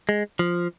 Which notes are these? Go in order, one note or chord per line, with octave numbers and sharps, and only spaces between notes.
G#3
F3